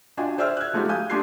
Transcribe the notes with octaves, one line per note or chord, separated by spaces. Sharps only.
D4 F4 F#4 D#5 G5 G#5
G#4 C5 D5 E5 E6 F6
F#6 G#6
F3 G#3 A3 D#4 F#4 G4
F5 G#5 D#6 G6
A3 D4 G4 C6 G#6 C7